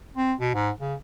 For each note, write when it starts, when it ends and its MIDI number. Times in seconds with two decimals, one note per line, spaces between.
0.17 0.33 60
0.40 0.51 47
0.54 0.70 44
0.81 0.95 49